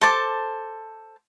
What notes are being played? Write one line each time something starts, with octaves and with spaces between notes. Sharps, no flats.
A4 C5 A5 D6